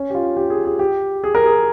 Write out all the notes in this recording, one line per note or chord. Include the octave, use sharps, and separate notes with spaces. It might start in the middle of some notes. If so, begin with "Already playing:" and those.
Already playing: C#4
G4
F4
G4
G#4
G#4
G4
G#4
A#4
G#4